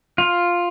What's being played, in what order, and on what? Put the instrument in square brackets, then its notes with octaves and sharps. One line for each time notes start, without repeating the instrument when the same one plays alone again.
[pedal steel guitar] F4